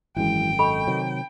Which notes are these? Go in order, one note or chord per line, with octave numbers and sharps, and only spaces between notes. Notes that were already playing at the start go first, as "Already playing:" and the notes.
G#1 F#2 E3 G#3 E4 G5
A4 D#5 B5 C#6
C3 D#3 F#3